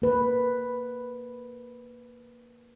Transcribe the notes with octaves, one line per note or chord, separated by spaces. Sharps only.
A#3 B4